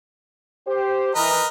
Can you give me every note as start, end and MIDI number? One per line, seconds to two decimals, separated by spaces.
0.67 1.12 67
0.67 1.12 72
1.15 1.38 52
1.15 1.47 70
1.15 1.47 71
1.15 1.47 75